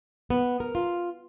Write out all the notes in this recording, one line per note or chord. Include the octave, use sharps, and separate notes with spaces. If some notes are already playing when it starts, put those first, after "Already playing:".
B3
A#4
F4